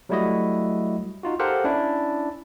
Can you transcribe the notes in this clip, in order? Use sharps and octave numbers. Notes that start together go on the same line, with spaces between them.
F#3 G3 A3 E4 F#4 D#5
D#4 F4 F#4
G4 A4 A#4 C5 F5 F#5
C#4 D4 E4